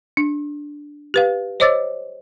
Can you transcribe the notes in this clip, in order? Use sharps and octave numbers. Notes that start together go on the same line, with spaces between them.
D4
G4 B4 F5
C5 C#5 D#5 D6 E6 A6